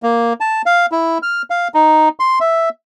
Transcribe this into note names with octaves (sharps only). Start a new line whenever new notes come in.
A#3
A5
F5
E4
F6
F5
D#4
C6
E5